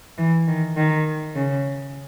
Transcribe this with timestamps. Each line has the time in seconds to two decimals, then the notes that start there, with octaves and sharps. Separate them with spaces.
0.18 E3
0.47 D#3
0.77 D#3
1.35 C#3